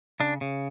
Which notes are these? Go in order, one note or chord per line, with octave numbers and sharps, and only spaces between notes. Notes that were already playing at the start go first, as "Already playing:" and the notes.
C#3 D4
C#3